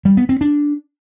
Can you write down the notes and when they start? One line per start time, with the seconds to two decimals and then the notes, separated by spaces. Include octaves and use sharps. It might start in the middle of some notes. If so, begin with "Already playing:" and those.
0.05 G3
0.17 B3
0.29 C4
0.41 D4